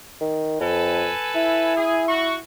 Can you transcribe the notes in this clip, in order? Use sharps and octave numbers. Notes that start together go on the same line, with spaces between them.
D#3
F2 A4 B4 G#5
E4
G#4
F#4 C#6